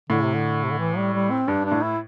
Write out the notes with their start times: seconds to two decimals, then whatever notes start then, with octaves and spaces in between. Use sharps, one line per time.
0.10 A2 D3
0.23 C3
0.34 D3
0.64 C3
0.70 D3
0.79 E3
0.97 G3
1.13 G3
1.31 C4
1.48 G2 D4
1.65 D4
1.72 A2
1.83 E4